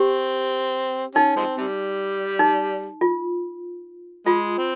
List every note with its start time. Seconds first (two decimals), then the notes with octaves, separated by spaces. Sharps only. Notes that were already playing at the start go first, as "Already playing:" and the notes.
Already playing: C4 G4
1.15 C#4 D#4
1.36 F3 G#3 C4
1.57 C3 G3
2.39 D#4
3.01 F4
4.26 G#3 F4
4.58 C4